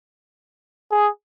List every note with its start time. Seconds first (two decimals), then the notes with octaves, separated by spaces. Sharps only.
0.92 G#4